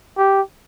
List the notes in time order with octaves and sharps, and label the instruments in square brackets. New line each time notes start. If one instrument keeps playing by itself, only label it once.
[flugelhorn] G4